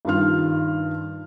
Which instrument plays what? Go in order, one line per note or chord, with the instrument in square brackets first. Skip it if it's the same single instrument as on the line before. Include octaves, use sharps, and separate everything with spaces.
[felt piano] G2 D#3 F4 F6